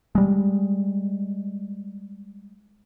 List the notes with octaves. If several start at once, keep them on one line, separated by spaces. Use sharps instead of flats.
G3 G#3